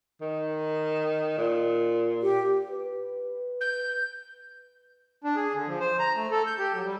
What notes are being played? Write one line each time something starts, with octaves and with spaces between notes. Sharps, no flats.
D#3
A#2
G4
B4
G6
D4
G#4
D3
F3
C5
A#5
A3
A4
G6
G4
F#3
G3